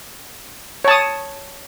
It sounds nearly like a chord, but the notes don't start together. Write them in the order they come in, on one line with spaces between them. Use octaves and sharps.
C#5 A5 D#6